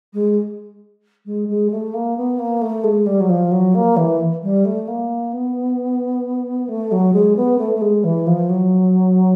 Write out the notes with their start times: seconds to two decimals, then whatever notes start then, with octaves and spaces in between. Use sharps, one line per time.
0.13 G#3
1.25 G#3
1.48 G#3
1.71 A3
1.94 A#3
2.17 B3
2.39 A#3
2.61 A3
2.84 G#3
3.06 G3
3.20 F#3
3.29 F3
3.51 F#3
3.74 A#3
3.96 E3
4.43 G3
4.65 A3
4.87 A#3
5.33 B3
6.68 A3
6.91 F#3
7.13 G#3
7.36 B3
7.58 A3
7.74 A3
7.81 G#3
8.04 E3
8.27 F3
8.49 F#3